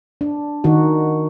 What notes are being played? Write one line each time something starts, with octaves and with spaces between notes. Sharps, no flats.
D4
D#3 D#4 F#4